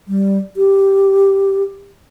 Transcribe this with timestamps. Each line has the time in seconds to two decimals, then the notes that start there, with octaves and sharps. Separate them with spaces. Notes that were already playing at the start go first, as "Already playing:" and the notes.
0.08 G3
0.57 G4